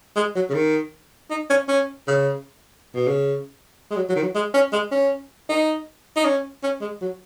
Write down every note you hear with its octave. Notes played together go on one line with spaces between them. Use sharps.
G#3
F#3
C#3
D#3
D#4
C#4
C#4
C#3
B2
C#3
G#3
F#3
F#3
D#3
F#3
G#3
C#4
G#3
C#4
D#4
D#4
C#4
C#4
G#3
F#3